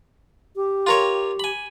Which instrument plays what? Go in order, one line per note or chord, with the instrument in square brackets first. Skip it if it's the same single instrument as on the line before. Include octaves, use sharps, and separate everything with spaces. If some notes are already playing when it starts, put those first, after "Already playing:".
[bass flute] G4
[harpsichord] F4 A#4 C#5
G#5 B5